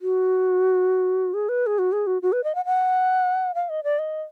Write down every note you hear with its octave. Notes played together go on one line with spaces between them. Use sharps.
F#4
G#4
B4
G#4
F#4
G#4
F#4
F#4
B4
D#5
F#5
F#5
F5
D#5
D5
D#5